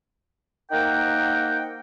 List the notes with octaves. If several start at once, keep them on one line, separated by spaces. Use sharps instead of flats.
A#3 D#4 A#4 C5 F#5 G5